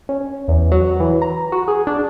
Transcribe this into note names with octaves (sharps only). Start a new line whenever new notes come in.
C#4
E2
F#3
E3
A#5
F#4
G#4
D4